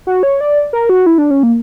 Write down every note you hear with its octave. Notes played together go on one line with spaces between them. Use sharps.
F#4
C#5
D5
A#4
F#4
E4
D4
C#4
A#3